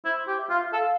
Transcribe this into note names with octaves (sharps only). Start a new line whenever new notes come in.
E4 C5
G4
E5
F4
A4 F5